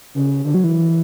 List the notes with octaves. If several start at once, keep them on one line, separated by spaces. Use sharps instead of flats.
C#3
D3
F#3
E3